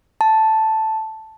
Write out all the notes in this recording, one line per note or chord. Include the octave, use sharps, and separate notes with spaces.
A5